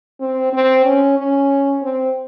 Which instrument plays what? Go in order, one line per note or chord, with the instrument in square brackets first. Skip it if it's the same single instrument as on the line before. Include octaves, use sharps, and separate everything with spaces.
[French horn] C4
C4
C#4
C#4
C4